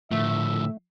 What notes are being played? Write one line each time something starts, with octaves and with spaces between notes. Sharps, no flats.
A2 D3 F3 A3 E5